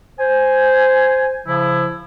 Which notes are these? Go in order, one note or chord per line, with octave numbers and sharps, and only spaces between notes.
C5 G#5
C#3 F3 E4